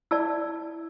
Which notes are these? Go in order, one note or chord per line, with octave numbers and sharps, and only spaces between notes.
E4 D5 A5 E6